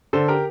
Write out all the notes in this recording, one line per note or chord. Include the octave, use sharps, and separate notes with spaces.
D3 A4 C5
G4 A#4